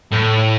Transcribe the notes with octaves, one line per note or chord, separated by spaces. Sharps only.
A2